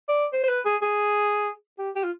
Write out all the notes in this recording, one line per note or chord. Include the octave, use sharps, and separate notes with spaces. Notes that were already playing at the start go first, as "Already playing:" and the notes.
D5
C5
C5
B4
G#4
G#4
G4
G4
F4